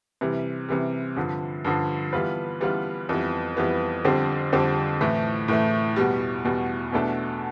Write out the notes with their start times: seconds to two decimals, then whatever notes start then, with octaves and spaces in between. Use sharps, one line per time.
0.21 C3 E3 G3
0.69 C3 E3 G3
1.16 G2 D3 F3
1.65 G2 D3 F3
2.13 E3 G3 B3 F4 B4
2.61 E3 G3 B3 F4 B4
3.09 F2 E3 G3 B3
3.57 F2 E3 G3 B3
4.04 F2 D3 G3 C4 G4
4.52 F2 D3 G3 C4 G4
5.01 A2 E3 A3
5.48 A2 E3 A3
5.96 E2 B2 G3
6.45 E2 B2 G3
6.92 E2 B2 A3 D4 A4